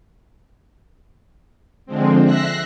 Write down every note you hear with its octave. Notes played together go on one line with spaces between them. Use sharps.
D3 F3 G#3 C4
E5 F#6 A#6 C7